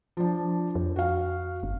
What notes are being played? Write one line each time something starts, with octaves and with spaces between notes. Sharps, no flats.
F3 D4
F2
F#4 F5
G1